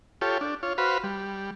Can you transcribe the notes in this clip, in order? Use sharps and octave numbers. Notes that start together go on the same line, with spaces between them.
F4 G4 A4 C#5
D4
F4 C#5
F#4 B4 C5 F5 B5
G3